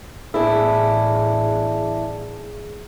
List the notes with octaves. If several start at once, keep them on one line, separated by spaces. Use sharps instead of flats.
A1 E2 D4 E4 G#4